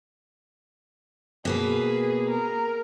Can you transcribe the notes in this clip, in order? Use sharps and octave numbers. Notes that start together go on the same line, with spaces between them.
B2 A#3 G#4 B4
A#4